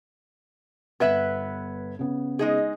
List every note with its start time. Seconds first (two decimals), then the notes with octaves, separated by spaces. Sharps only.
1.00 G1 B3 B4 E5 G#6
1.99 C#3 B3
2.39 G#3 D#4 G#4